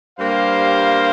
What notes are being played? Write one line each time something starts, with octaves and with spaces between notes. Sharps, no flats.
G2 G3 A#3 C5 F5